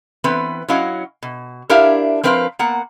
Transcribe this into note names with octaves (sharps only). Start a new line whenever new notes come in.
E3 B3 C4 B4
F#3 C#4 E4 D#5 F5 F#5
B2
D4 E4 G4 A#4 E5 F5
F3 C4 A#4 B4 D#5 F5
A#3 B3 F#5